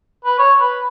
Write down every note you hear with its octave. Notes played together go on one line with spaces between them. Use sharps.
B4
C#5
B4